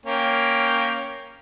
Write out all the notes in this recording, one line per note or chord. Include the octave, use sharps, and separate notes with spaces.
A#3 C#4 G5